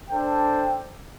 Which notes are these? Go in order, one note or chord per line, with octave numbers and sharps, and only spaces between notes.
D4 A4 C5 G5